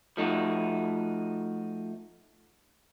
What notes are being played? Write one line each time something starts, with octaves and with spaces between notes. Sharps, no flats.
F3 A3 D#4 F#4